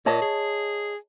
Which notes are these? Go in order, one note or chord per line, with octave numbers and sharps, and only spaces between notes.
A#2 C#5 D#5 A5
G#4